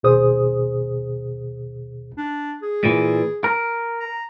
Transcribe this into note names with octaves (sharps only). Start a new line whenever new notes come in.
D#2 B2 G#4 C5 D#6
D4
G#4
A#2 E3
A#4
A#5